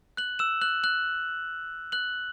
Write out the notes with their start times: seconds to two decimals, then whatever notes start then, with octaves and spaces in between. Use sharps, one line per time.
0.17 F#6 F#7
0.39 E6 E7
0.62 F#6 F#7
0.84 F#6 F#7
1.92 F#6 F#7